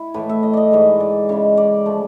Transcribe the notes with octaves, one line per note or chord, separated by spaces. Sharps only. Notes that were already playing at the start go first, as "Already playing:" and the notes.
Already playing: E4
A2 E3 A3 B4
E5
D#5
D5 D#5
G#2 E3 G#3
D5
C#3 E3 G#3
D5
F3 A3